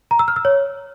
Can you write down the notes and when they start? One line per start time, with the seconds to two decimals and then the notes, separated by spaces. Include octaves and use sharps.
0.11 A#5
0.19 E6
0.28 F6
0.36 E6
0.45 C#5